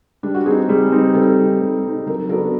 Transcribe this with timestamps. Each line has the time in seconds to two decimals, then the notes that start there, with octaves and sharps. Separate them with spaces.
0.23 G3 D4
0.35 F#4
0.46 C4 D#4 G#4
0.69 G3 G#4
0.92 C4 D#4
1.15 G3 A4
1.39 C4 D#4
1.61 G3
1.84 C4 D#4
2.07 F#3 A#4
2.29 B3 D4 F#4 A4 A#4